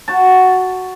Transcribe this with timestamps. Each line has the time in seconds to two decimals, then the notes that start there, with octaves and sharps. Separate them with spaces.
0.08 F#4 A5